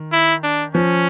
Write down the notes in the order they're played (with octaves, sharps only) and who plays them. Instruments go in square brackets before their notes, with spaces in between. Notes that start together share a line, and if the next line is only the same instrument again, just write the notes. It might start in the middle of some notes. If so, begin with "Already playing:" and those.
Already playing: [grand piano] D#3
[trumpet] E4
D4
[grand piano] F3 [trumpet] C#4